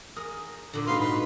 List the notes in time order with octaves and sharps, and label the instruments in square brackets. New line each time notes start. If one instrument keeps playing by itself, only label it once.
[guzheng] G#4 A#4 [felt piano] D#6
[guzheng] A#2 D3
[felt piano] G#2 F#4 [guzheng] D#4 [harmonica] B4 F5 C6
[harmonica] B4